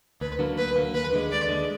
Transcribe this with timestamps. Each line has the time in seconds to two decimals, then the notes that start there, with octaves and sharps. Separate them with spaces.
0.21 D2 B4
0.39 D3 F#3 A#3
0.57 D2 B4
0.76 D3 F#3 A#3
0.94 D#2 B4
1.13 D3 G#3
1.31 D#2 D5
1.49 D3 G#3